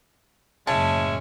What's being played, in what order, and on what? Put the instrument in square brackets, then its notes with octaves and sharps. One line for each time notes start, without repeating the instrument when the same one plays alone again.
[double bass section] F#1 A2 [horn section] G#3 C#4 E5 [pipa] A5